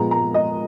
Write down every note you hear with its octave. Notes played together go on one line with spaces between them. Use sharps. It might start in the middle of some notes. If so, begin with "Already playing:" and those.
Already playing: A#2 F3 G#3 B3 A#5
A#5
D#5